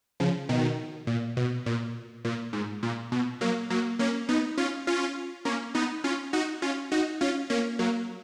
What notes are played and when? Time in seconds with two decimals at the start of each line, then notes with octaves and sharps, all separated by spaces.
0.20 C#3 F3
0.49 B2 D#3
1.07 A#2
1.37 B2
1.66 A#2
2.25 A#2
2.53 G#2
2.83 A#2
3.12 B2
3.41 F#3 A#3
3.70 F#3 A#3
3.99 A#3 C#4
4.29 B3 D#4
4.58 C#4 F4
4.87 C#4 F4
5.45 A#3 C#4
5.75 B3 D#4
6.04 C#4 F4
6.33 D#4 F#4
6.62 C#4 F4
6.92 D#4 F#4
7.21 C#4 F4
7.50 A#3 C#4
7.79 F#3 A#3